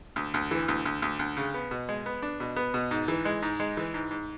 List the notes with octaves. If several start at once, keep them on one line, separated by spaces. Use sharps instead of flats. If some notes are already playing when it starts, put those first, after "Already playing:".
D2
D2
E3
D2
D2
D2
D2
C#3
B3
B2
G#3
B3
D4
B2
B3
B2
G#2
E3
G#3
G#2
G#3
E3
G#2
G#2